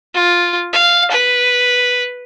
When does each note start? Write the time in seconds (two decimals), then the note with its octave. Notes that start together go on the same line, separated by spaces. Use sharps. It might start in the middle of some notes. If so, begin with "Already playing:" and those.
0.14 F4
0.73 F5
1.11 B4